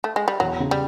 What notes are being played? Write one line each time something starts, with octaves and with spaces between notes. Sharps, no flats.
A3
G#3
G3
E2 F#3
C#3
G3